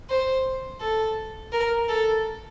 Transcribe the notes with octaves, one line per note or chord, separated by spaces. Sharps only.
C5
A4
A#4
A4